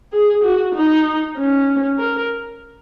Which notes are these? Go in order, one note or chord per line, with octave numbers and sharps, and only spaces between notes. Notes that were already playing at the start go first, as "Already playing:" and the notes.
G#4
F#4
D#4
C#4
A#4